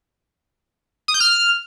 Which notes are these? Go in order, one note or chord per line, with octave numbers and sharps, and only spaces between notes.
D#6
G6
F6